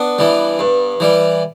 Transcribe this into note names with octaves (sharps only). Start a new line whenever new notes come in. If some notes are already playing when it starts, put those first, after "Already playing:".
Already playing: B3 D4
E3 G3
G2
E3 G3